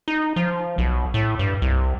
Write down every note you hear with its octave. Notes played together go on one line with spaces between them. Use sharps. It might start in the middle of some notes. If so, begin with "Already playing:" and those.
D#4
F3
B1
A2
G2
C2